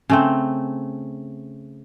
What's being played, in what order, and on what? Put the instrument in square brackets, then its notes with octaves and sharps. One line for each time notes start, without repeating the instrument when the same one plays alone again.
[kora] C#3 A3 C4